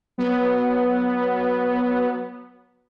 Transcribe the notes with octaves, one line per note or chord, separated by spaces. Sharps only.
F#3 B3